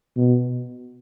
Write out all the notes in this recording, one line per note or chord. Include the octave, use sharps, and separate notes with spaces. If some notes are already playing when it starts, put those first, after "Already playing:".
B2